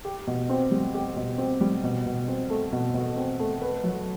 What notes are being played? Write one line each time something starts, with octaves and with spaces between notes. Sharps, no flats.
G4
B2
C4
G3
G4
B2
C4
G3
B2
B2
C4
A3
B2
B2
C4
A3
B4
F#3